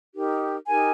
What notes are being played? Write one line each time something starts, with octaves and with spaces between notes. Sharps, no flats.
D#4 G4 A#4
D#4 G4 A#4 G#5